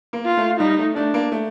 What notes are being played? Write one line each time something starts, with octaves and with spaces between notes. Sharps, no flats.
A#3
F4
A3
G3 D#4
A3
A3 D4
A#3
A3